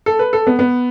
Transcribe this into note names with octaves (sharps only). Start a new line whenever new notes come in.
A4
B4
A4
B3
B3